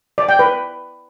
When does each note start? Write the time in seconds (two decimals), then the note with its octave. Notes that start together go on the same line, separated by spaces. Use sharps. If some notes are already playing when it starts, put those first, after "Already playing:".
0.18 D5
0.29 G5
0.39 B4